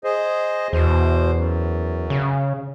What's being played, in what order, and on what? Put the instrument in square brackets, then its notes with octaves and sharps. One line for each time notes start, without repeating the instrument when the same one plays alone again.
[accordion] G#4 C5 D#5
[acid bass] E2 [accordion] B2 C5
[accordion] F#2
[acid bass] C#3